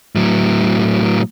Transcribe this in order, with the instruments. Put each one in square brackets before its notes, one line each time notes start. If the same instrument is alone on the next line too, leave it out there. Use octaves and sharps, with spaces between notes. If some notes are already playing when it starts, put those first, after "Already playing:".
[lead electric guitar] A2 F#3